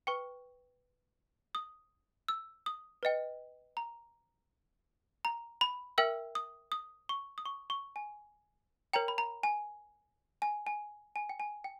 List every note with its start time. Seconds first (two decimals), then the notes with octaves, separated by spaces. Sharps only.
0.07 B4 G5 C#6
1.55 D#6
2.28 E6
2.66 D#6
3.03 B4 D#5 G5
3.77 A#5
5.25 A#5
5.61 B5
5.98 A#4 E5 G5 E6
6.35 D#6
6.72 D#6
7.09 C#6
7.38 D#6
7.46 C#6
7.70 C#6
7.96 G#5
8.93 A#4 C#5 G5 A#5
9.08 B5
9.18 A#5
9.43 G#5
10.42 G#5
10.67 G#5
11.16 G#5
11.29 G5
11.40 G#5
11.64 G5